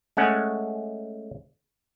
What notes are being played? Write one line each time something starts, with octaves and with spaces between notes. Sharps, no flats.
G#3 A3 C#4 F#5